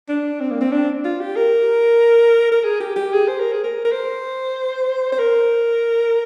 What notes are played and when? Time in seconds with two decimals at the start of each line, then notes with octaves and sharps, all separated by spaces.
0.09 D4
0.40 C4
0.51 A#3
0.61 C4
0.72 D4
1.04 F4
1.20 G4
1.36 A#4
2.52 A#4
2.64 G#4
2.80 G4
2.96 G4
3.13 G#4
3.28 C5
3.40 A#4
3.53 G#4
3.64 A#4
3.85 A#4
3.92 C5
5.12 C5
5.19 A#4